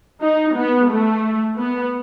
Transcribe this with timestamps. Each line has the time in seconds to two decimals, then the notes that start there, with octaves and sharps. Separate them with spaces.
0.22 D#4
0.56 B3
0.90 A3
1.58 B3